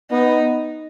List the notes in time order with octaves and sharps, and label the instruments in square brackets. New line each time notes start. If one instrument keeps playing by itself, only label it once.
[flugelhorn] B3 [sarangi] D#4